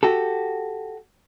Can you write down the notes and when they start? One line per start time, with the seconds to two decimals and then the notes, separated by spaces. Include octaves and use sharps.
0.03 F#4 G4 A4